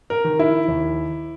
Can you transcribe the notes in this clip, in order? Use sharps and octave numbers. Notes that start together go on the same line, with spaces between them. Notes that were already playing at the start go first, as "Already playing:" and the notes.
A#4
D#3
E4
D#2